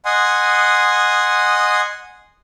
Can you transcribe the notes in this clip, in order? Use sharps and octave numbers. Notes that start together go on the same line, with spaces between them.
D#5 F#5 G#5 C6 D#6